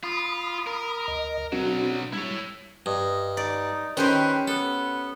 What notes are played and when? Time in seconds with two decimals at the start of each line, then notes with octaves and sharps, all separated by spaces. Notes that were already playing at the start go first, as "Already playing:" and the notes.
0.04 F4 B5 D#6
0.67 A#4
1.08 D2 D#5
1.52 B1 F#3 C4 D4 F#4
2.13 G3 E4 C#5
2.86 G2 D#5
3.37 D#4 D5
3.97 D#3 C#4 G4 B4 C5
4.48 B3 A4